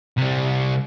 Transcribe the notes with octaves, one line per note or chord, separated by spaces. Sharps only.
C3 G3